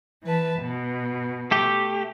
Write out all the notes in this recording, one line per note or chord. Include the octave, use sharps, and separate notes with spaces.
E3 B4 A5
B2
A3 G4